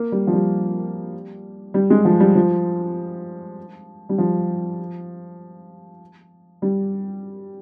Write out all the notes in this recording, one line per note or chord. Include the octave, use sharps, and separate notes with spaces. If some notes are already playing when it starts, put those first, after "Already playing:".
Already playing: A#3
G3
F3
G3
G3
G#3
F3
G3
F3
G3
F3
G3